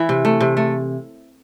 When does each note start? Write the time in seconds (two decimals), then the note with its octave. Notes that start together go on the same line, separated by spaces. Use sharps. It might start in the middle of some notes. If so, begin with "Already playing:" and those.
Already playing: E3 E4
0.09 C3
0.25 A3
0.40 C3
0.57 A3